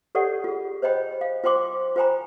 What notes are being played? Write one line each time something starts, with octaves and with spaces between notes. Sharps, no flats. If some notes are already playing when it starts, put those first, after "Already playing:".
G4 A4 C#5 D5 F#5
F4 G#4
C5 C#5 D#5 G5 B5
F5
F4 C5 G5 C6 D6
F4 C5 G5 G#5 A#5 B5